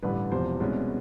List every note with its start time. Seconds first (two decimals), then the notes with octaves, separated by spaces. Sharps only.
0.03 A1 G2 D3 G3 B4
0.31 E1 E2 C3 F3 C5
0.60 C2 B2 G#3 C#4